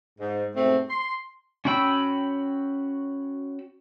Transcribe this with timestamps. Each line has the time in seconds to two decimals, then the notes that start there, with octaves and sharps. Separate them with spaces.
0.19 G#2
0.56 G#2 B2 A3 C4
0.89 C6
1.65 C#4 F#4 G5 B5 E6